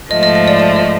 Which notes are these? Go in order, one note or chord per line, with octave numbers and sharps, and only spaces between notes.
G#2 F3 A3 D#5
D#5
D#5
D5
D5
D#5